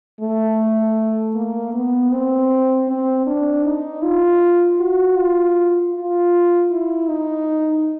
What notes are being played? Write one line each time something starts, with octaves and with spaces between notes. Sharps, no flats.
A3
A#3
B3
C4
C4
D4
D#4
F4
F#4
F4
F4
E4
D#4